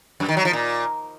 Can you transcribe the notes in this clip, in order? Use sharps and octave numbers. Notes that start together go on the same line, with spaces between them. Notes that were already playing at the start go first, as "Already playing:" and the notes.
F#2
D#3
F#3
F3
A#2